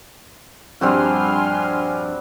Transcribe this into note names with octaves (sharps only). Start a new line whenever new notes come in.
A#1 G2 G3 C4 F#4 G#5 C6 F6